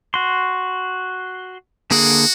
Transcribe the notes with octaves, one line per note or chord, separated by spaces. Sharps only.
F#4 C6
D3 A#3 F#4 G#4